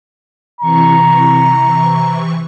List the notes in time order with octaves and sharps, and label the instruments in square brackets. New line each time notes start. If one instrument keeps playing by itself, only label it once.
[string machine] C3 E3 C#6 [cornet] A#5